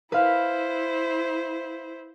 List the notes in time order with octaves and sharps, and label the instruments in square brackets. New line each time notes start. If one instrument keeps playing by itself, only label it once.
[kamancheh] E4 C5 [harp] B4 F5